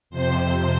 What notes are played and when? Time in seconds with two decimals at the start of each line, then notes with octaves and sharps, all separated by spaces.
0.10 F2 C3 C5